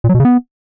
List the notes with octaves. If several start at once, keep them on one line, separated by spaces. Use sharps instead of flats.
A#2
F#3
B2
C#3
B3